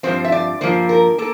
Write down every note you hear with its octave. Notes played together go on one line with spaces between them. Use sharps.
G2 F3 C4 C5
E5
D5
G2 F3 A#3 C5
A#4
A#3 A4